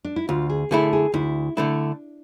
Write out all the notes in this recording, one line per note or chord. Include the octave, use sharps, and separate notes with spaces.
D4
E4
D2 F4
G#4
D3 A3 E4 G#4
G#4
D2 E4
D3 A3 D4 E4